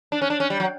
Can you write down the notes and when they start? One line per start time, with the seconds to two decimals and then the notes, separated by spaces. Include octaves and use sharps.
0.12 D4
0.22 C#4
0.30 D4
0.40 C#4
0.50 G3
0.60 F#3